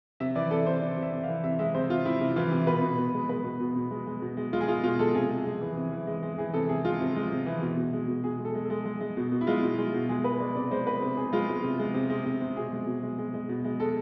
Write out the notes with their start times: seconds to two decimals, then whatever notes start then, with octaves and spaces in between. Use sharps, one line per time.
0.20 C3 E5
0.35 E3 D5
0.51 C3 A4
0.66 C3 C5
0.82 C3 D5
0.97 C3
1.02 E5
1.13 C3
1.23 F5
1.28 E3
1.44 C3 E5
1.59 G#3 E5
1.74 C3 C5
1.90 C3 F4
2.05 C3 E4
2.21 C3
2.36 E3 F4
2.51 C3
2.67 B2 B4
2.82 B2
2.98 B2
3.14 G#3
3.29 G#3 B4
3.44 B2
3.60 B2
3.76 B2
3.91 G#3
4.07 G#3
4.22 B2
4.37 G#3
4.53 G#3 F4
4.61 G#4
4.68 G#3 F4
4.84 B2 F4
4.99 G#3 A4
5.14 C3 G#4
5.30 C3
5.46 G#3
5.61 E3
5.77 C3
5.92 E3
6.07 G#3
6.23 G#3
6.38 E3 G#4
6.54 C3 A4
6.69 C3 G#4
6.84 G#3 F4
7.00 C3
7.16 G#3
7.31 C3
7.46 E3
7.62 B2
7.77 B2
7.93 G#3
8.08 B2
8.24 B2 G#4
8.39 G#3
8.45 A4
8.55 G#3
8.65 A4
8.70 G#3
8.85 G#3
9.01 G#3
9.17 B2
9.32 B2
9.41 E4
9.47 G#3 F4
9.63 B2
9.78 G#3
9.94 B2
10.09 G#3 G#4
10.24 G#3 B4
10.40 G#3 D5
10.55 C3 D5
10.71 G#3 C5
10.87 G#3 B4
11.02 C3
11.17 C3 G#4
11.33 G#3 F4
11.49 G#3
11.64 C3
11.79 G#3
11.94 C3
12.10 G#3
12.25 C3
12.41 C3
12.56 B2 G#4
12.72 G#3
12.87 B2
13.03 G#3
13.19 G#3
13.34 G#3
13.49 B2
13.65 G#3
13.80 G#3 A4